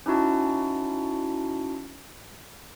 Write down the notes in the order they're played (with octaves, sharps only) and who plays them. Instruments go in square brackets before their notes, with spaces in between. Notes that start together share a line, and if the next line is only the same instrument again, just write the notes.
[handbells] C#4 D#4 E4 F#4 A5